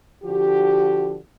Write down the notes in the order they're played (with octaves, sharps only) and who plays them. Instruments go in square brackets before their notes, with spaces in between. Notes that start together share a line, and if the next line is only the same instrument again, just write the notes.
[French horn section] D3 F3 F#4 G4